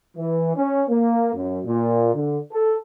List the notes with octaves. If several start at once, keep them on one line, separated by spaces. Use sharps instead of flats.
E3
C#4
A#3
F#2
A#2
D3
A4